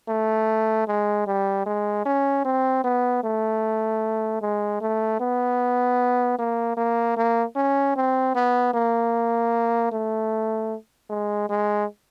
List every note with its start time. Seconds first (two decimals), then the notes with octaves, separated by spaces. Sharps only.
0.09 A3
0.88 G#3
1.27 G3
1.66 G#3
2.06 C#4
2.45 C4
2.84 B3
3.24 A3
4.42 G#3
4.81 A3
5.20 B3
6.39 A#3
6.77 A#3
7.17 A#3
7.56 C#4
7.96 C4
8.35 B3
8.74 A#3
9.92 A3
11.10 G#3
11.49 G#3